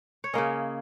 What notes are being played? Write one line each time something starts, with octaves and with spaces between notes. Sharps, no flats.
C#5
C#3 A#3 C#4 D#5